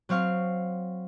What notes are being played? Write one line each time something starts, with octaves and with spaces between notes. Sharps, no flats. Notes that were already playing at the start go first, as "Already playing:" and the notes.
F#3 C4 F5 C#6 F6